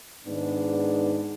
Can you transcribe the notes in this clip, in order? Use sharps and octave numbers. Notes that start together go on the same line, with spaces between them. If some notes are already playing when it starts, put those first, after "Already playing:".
G#2 D#3 G#3 B3 D4